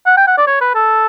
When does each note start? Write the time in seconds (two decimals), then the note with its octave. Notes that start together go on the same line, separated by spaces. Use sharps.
0.06 F#5
0.17 G5
0.27 F#5
0.38 D5
0.47 C#5
0.61 B4
0.75 A4